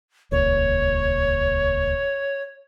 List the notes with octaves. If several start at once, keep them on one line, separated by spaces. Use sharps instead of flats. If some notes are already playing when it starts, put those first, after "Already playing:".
D#1 C#2 A#2 C#5